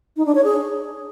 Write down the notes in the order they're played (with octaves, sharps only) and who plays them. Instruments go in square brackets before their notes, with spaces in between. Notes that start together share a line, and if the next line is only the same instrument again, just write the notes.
[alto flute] D#4
D4
C#5
G#4